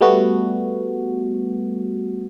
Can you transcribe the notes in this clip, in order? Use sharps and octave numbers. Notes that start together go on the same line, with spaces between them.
G3 A3 B3 F#4